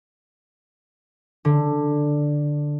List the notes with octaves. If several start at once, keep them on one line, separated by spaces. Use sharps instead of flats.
D3